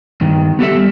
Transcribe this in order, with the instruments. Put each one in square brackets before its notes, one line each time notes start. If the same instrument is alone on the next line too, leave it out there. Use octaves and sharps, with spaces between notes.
[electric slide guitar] G2 D#3
B3 G4 A4 E5
G3